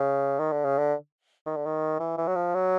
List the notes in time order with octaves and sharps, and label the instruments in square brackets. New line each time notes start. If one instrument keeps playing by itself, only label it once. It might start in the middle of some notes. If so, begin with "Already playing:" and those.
Already playing: [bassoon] C#3
D#3
D3
C#3
D3
D#3
D3
D#3
E3
E3
F#3
F3
F#3